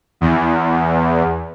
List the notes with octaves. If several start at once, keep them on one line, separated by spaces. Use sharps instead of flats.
E2